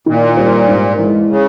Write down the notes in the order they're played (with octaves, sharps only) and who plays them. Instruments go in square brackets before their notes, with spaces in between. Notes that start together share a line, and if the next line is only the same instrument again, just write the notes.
[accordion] A#2 [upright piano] D#3
[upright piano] G3 C4 D#4
G#2
E3 G#3
[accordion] C#3